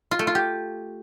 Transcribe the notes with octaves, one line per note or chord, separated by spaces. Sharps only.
F4
A3
F4
G4